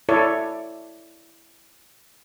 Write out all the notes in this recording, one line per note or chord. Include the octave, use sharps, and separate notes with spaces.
E4 A4 C#5 D5